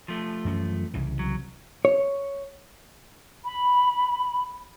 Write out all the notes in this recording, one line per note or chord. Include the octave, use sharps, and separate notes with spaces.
F3 A3
F#2 E3 C#4
C2 C#3 E3
F#3
C#5
B5